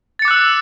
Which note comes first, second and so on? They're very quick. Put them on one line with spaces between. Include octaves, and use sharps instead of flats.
A6 C#7 D6 F#6 E6